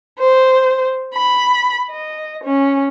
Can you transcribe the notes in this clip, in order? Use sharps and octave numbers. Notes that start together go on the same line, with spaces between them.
C5
B5
D#5
C#4